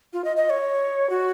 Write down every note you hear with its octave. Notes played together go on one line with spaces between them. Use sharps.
F4
D#5
D#5
C#5
F#4